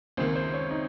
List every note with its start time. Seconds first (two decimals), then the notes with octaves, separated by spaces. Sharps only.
0.17 C#2 C3 D#3 A#3 C5
0.36 C5
0.54 C#5
0.71 D#4